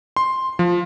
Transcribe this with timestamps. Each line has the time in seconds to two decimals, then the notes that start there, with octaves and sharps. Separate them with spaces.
0.16 C6
0.59 F3